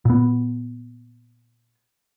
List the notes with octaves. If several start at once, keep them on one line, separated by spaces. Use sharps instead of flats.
A#2 B3